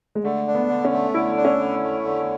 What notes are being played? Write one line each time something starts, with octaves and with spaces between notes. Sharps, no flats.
G#3
D3 A3
D4
B3
D3
C#4
A3
D3 E4
D4
C#4
D3
A3
D3